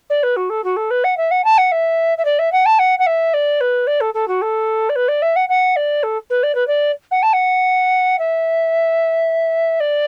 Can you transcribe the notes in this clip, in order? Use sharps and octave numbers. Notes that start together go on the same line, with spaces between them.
D5
B4
F#4
A4
F#4
A4
B4
F#5
E5
F#5
A5
F#5
E5
E5
D5
E5
F#5
A5
F#5
F#5
E5
D5
B4
D5
A4
A4
F#4
A4
D5
B4
D5
E5
F#5
F#5
D5
A4
B4
D5
B4
D5
F#5
A5
F#5
E5
D5